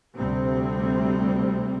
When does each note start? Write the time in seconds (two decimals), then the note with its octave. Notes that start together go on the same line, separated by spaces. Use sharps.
0.15 D2 C3 G3 C4